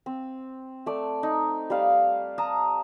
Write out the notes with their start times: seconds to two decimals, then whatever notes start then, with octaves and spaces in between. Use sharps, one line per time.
0.06 C4
0.86 A3 D5
1.23 D#4
1.70 G3 D5 F5
2.38 A5 A#5 D#6